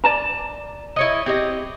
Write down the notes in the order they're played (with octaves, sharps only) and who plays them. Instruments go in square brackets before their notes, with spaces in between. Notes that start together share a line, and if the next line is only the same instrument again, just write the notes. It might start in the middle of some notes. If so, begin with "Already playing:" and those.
[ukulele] D5 A5 A#5
[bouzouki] E4 C#5 D#5
C4 G4 D#5